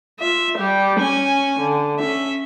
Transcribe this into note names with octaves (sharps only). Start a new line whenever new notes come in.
F4 E5
G3 G4
C#4 G#5
D3
C#4 E5